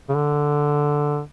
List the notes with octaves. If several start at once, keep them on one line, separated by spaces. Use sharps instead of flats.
C#3
D3